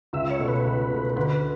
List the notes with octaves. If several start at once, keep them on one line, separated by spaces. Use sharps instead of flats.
C#2 E5
C#5
B2 A3
B4
C#2
B2 A3
D2 B4
B4